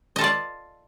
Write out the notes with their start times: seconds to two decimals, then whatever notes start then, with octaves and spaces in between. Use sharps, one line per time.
0.16 D#5
0.19 A4
0.21 F4
0.24 D5